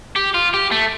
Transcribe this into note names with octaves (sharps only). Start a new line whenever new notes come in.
G4
F4
G4
A3